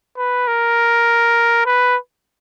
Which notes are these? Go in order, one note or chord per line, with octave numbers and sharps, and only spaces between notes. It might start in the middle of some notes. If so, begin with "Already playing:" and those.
B4
A#4
B4